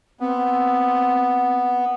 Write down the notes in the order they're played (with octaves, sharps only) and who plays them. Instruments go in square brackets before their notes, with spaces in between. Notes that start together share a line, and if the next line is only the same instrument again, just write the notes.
[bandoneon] B3 [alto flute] C4